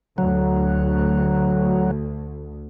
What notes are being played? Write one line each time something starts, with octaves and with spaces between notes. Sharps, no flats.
D2 F#3